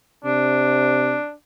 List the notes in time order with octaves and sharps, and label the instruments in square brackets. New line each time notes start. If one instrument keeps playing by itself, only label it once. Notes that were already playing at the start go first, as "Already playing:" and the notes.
[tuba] C3 [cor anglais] D4